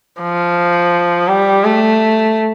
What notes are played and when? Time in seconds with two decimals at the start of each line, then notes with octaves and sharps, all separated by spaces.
0.21 F3
1.29 G3
1.64 A3